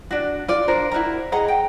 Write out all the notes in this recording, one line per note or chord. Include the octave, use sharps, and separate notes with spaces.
D4 F#4
F4 D5
D4 A#4 C5
E4 F#4 A#4 A#5
G#4 D#5 F#5 A#5
G5